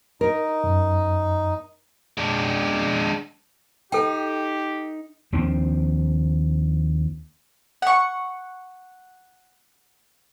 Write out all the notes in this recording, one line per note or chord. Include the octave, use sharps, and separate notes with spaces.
D#4 A#4
F#2
G#3 D4
D#4 G4 A4 G5
D#2 F3 C4 D4
F#5 C#6